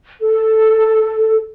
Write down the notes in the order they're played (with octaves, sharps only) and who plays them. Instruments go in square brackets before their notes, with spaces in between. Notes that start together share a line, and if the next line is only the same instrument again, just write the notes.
[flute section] A4